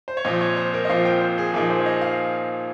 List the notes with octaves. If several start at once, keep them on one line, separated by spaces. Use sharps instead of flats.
C5
C#5
A#2 F3 C4 D#5
C#5
C5
A#4
D#5
A#2 F3 C4 F5
G5
C5
G#4
A#2 F3 A#3 D#4 G#4
C5
C#5
D#5
D#5
F5